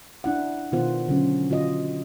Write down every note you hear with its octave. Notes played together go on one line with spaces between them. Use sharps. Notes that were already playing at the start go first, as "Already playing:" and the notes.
D4 E4 F#5
B2 D#3 B3 F4 C5 F#5
D3 F#3 C#4
D3 F4 F#4 D#5